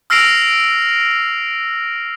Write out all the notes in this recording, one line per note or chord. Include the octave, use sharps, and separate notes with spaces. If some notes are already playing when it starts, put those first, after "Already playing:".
E6 F6 A#6 C7 D7 F7